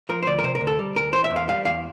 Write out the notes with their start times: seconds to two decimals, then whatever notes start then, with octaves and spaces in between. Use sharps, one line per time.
0.09 F3 A#4
0.23 C5
0.26 D2 D5
0.39 A#4
0.43 C3 C5
0.55 A#4
0.61 D2
0.67 A4
0.79 G3
0.95 D2 A#4
1.13 E3 C5
1.24 E5
1.30 E2
1.36 F5
1.48 G3 F5
1.65 E2 F5